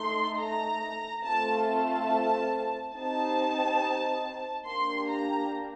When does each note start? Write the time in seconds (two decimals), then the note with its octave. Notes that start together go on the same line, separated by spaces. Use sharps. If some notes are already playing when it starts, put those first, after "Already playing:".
Already playing: A3 D#4 A4 C6
0.38 A#5
1.24 A3 C4 F4 A4 A5
1.67 A5
2.94 C4 D#4 G4 A5
4.65 A#3 D4 G4 C6
5.08 A#5